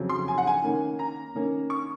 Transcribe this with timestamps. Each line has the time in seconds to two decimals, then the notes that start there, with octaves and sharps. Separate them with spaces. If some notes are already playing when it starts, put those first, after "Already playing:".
Already playing: F2 C#3 F#3 C4
0.09 C6
0.28 G#5
0.38 F#5
0.47 G#5
0.64 D#3 A#3 C#4
0.99 A#5
1.35 D#3 A#3 C#4
1.70 C#6